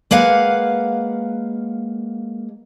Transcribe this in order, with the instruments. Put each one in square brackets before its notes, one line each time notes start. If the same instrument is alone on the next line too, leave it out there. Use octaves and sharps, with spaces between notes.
[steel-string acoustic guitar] G#3 A#3 B4 F5 F#5